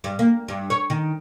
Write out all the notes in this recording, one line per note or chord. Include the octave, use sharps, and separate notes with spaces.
G2
A#3
G2
C#5
D#3